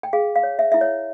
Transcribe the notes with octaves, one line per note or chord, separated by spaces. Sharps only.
G5
G#4 F5
F5
C#5
E5
E4 E5
C#5